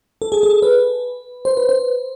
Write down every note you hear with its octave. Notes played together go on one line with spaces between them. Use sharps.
A4
G#4
A4
B4
C5
B4
C5